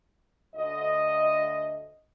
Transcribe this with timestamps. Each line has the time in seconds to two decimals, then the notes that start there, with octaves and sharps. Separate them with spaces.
0.55 D2 D#5